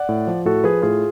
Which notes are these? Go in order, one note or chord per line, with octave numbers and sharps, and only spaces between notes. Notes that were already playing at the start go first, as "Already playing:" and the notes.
Already playing: D5 F#5
A2
F3
A2 F#4 A4
F3 G#4 B4
A2 F4 G#4